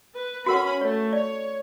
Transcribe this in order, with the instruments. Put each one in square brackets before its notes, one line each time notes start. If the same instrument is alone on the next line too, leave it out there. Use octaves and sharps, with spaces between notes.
[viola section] B4
[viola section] C#4 B5 [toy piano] F#4 A#4 F#5
[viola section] A3 [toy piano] C#5
[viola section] C#5 [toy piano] D5